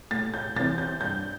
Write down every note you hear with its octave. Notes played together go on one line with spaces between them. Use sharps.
A2 A6
G6
E3 C4 A6
G6
G2 G6